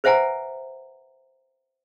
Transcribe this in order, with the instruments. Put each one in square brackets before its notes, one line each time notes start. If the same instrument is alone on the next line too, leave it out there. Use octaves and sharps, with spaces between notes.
[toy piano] B4 C5 E5 F#5 G#5 A#5